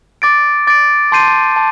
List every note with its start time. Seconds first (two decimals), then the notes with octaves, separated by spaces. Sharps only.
0.22 D6 A6 D7
0.67 D6 A6 D7
1.12 A5 C6 G6 C7 D#7
1.56 A5